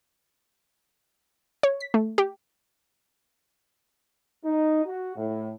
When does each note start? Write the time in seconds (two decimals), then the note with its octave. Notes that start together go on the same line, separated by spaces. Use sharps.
1.63 C#5
1.80 B6
1.94 A3
2.18 G4
4.45 D#4
4.86 F#4
5.16 A2